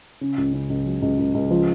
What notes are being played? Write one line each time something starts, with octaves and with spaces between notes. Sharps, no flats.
C#3
C#2
C#3
C#2
F#3
C#2
C#2
C#2
F3